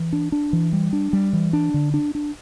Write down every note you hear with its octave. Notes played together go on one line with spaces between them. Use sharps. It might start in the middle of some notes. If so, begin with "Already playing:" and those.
Already playing: E3
D4
D4
E3
G3
D4
G3
E3
D4
D3
D4
D4